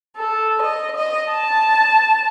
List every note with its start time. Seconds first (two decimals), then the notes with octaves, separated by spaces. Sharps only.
0.16 A4
0.62 D#5
0.96 D#5
1.32 A5